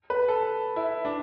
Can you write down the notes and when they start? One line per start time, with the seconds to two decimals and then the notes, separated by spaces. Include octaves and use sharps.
0.10 B4
0.28 A4
0.76 E4
1.05 D4